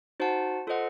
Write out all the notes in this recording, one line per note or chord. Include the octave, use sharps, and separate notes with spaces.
D#4 F#4 C5 F#5 A5
F4 A4 C5 D#5 F#5